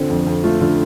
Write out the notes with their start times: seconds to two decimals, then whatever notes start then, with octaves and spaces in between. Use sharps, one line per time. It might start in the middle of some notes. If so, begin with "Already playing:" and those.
Already playing: D3 C4 F4
0.10 F2
0.27 F2
0.43 A3 F4
0.61 D3 F4